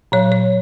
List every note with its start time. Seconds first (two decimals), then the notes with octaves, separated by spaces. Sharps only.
0.12 A#2 F#3 C#5
0.32 C#5